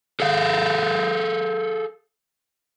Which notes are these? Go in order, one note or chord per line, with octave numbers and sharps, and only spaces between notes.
G#4 A4 F5